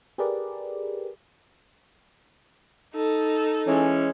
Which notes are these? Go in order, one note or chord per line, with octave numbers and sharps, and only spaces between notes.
G4 G#4 A#4 B4 D5
D#4 A4
E3 G#3 C#4